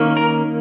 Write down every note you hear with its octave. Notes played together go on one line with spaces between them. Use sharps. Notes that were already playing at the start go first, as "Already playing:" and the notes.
Already playing: D#3 A#3 C#4
A#4